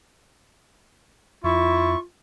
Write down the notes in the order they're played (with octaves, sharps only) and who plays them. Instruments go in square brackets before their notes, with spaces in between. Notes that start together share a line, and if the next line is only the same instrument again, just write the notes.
[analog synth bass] F2 [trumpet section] E4 [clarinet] F4 [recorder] C#6